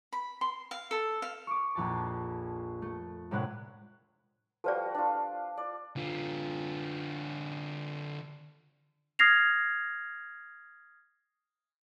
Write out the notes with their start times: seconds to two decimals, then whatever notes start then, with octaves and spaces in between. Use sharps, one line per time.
0.13 B5
0.41 C6
0.71 F5
0.91 A4
1.22 F5
1.47 C#6 D6
1.75 A#1 F2 A5
2.82 A3
3.31 A2 C3 G#3 D4 B4 F#5
4.64 F3 G3 F#4 A4 B4 D5
4.94 D4 F4
5.57 D5
5.96 D3 F4
9.19 D#6 F6 G#6 A#6 C7 F7